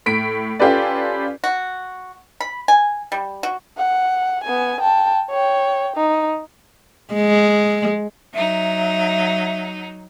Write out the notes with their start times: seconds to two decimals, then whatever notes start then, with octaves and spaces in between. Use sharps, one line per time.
0.06 A2 B6 D7
0.59 C#4 F4 G4 A4 B4 D5
1.44 F#4
2.41 B5
2.68 G#5
3.12 G3
3.43 F#4
3.77 F#5
4.44 B3 G#5
4.81 G5 A5
5.30 C#5 G5
5.96 D#4
7.14 G#3
8.34 F#3 D#4 E5